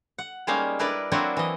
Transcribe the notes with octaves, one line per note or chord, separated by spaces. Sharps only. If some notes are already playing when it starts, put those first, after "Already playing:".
F#5
G3 G#3 A#3 C#4 D#4 F5
D4 E4 A#4 B4 D5
F#3 A#3 C4 D4 E4 F#4
E3 D#5